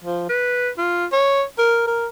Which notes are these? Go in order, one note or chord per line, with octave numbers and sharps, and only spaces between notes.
F3
B4
F4
C#5
A#4
A#4